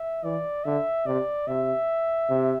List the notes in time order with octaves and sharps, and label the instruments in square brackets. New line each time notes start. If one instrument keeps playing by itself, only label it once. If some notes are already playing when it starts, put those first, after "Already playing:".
Already playing: [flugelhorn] E5
[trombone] E3 [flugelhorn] D5
[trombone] D3 [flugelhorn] E5
[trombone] C3 [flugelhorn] D5
[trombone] C3 [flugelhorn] E5
[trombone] C3